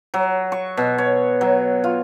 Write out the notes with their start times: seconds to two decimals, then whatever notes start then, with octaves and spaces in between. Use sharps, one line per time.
0.14 F#3
0.52 C#6
0.77 B2
0.98 C#5
1.41 F#3
1.84 F4